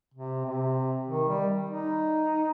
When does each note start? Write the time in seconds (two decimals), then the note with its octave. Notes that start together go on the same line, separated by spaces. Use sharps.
0.14 C3
0.45 C3
1.08 D#3
1.28 G3
1.70 D#4